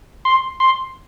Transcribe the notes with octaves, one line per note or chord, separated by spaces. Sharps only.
C6
C6